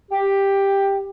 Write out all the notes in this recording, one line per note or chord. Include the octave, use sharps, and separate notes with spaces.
G4